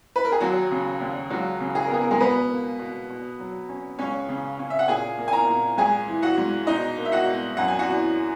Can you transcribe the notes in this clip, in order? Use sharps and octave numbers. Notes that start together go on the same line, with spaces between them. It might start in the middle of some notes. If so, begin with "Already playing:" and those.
B4
A#4
G#4
D#2 F#3 F#4
C#3
D#2
C#2 F#3 F#4
C#3
G#4
A#4
B3 G#4
A#4
G#3 G#4
B2 B3 B4
A#3
B2
B2
F#3
C#4
C#2 C#4 C#5
C#3
C#4
E5
F#5
A#2 G#4 G#5
A#3
G#5
A#4 A#5
A#2
G#2 G#4 G#5
E3
F#4 F#5
G#2
B2 D#4 D#5
A#3
E5
F#4 F#5
B2
F#2 F#5
G#5
F#4 F#5
E3